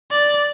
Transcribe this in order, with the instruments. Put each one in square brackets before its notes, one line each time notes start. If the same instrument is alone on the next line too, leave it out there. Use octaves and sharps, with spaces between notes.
[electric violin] D5